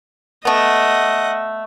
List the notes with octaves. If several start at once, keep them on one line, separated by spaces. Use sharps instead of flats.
A3 B3 D#5 F#5